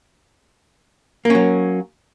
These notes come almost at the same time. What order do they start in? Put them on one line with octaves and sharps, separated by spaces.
A#3 C#4 F#3